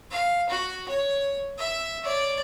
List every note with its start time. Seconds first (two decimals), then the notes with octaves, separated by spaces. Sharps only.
0.11 F5
0.49 F#4
0.88 C#5
1.58 E5
2.02 C#5 D5